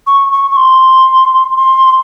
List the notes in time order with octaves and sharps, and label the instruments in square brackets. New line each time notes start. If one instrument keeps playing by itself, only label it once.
[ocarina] C#6
C#6
C#6
C6
C6